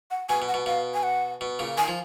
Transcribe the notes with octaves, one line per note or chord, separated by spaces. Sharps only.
F#5
B2 G#5
B2
F#5
B2
B2 F5
G#5
F#5
B2
A#2 C#3
D#3 G#5
F3